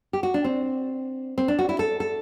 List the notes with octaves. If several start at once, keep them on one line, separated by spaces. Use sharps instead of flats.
G4
F#4
D4
C4
C4
D4
F#4
E4
A4
A4